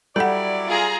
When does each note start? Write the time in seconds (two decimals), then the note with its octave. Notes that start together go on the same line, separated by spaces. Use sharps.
0.16 F#3 G3 E4 A4 D5 F#5
0.68 F4 G#4 A#5